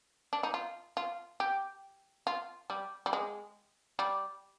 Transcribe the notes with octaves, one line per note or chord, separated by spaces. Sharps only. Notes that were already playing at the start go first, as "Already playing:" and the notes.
D4
D#4
F4
F4
G4
F4
G3
G3
G#3
G3